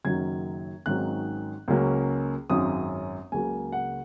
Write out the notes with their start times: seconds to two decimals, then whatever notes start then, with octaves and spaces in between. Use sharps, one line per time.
0.04 F#1 F#2 D#3 F#3 G#6
0.86 G#1 G#2 D#3 F#3 C#4 F#6
1.68 C#2 C#3 F#3 A#3 C#4
2.50 G#1 F#2 F#3 C#4 D#6
3.32 C#2 C#3 F#3 A#3 G#5
3.72 F#5